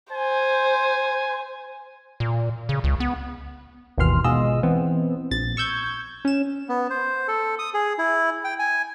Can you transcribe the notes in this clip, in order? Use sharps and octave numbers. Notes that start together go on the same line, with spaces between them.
C5 G#5
A#2
C#3
C#2
B3
G#1 D#2 B2 E3 C6 F6
G#2 B2 F4 G#4 D#5 E6
E3 B3 C4
A#1 A6
C#6 E6 G6 G#6
C#4 E7
B3
C5
A4
D#6
G#4
E4
G5
G#5